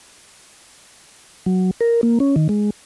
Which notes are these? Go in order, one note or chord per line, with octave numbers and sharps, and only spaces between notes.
F#3
A#4
A#3
C#4
D#3
G#3